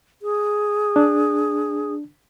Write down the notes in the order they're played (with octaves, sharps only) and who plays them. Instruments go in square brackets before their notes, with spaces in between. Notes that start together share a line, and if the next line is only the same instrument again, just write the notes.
[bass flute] G#4
[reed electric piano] D4